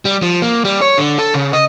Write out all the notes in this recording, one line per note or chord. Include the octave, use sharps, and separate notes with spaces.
G3
F3
A#3
G3
C#5
D3
A4
C#3
D#5